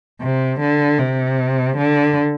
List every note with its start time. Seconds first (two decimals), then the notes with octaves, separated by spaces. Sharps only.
0.21 C3
0.60 D3
0.99 C3
1.77 D3